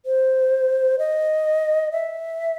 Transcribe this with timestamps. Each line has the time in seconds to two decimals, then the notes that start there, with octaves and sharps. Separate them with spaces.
0.06 C5
0.99 D#5
1.92 E5